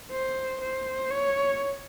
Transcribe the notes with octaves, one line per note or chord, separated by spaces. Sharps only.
C5
C5
C#5